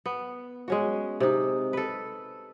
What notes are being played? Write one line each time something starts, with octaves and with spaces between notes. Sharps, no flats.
B3
G#3 C#4 F#4
C3 D#4
A4 B4